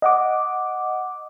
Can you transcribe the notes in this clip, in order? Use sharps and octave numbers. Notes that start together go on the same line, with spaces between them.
D#5 F#5 D6